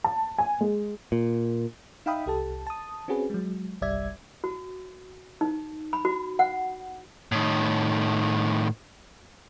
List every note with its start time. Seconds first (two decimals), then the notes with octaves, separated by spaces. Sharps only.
0.04 A5
0.38 G#5
0.61 G#3
1.12 A#2
2.06 D#4 E5 F5 G5 B5 D#6
2.26 C2 G4 A4 A5
2.67 A5 D#6
3.08 C4 C#4 F#4 G#4 B4
3.30 F#3 G#3
3.81 G1 C2 G3 D5 E5 G#6
4.44 F#4
5.41 D#4
5.93 B5
6.05 F#4
6.39 F#5
7.32 A2 D#3